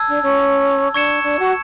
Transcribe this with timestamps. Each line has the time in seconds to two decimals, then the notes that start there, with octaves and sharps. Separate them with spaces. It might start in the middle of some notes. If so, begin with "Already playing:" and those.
Already playing: A5 E6 G#6
0.08 D4
0.23 C#4
0.94 D4 C#6 G#6 C#7 E7
1.23 D4
1.39 F#4